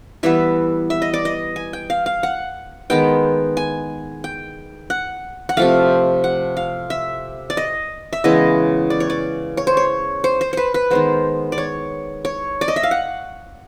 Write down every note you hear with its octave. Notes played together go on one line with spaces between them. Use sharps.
E3 G3 B3 E5
E5
D#5
D5
D#5
G#5
G5
F5
F5
F#5
D#3 G#3 B3 G5
G#5
G5
F#5
F#5
C3 F3 A3 F5
F#5
F5
E5
D5
D#5
E5
C#3 E3 G#3 B3 D#5
D5
C#5
D5
C#5
C5
C#5
C5
C5
B4 C5
B4
D#3 G#3 B3 C5
D5
C#5
C#5
D5
D#5
E5
F5
F#5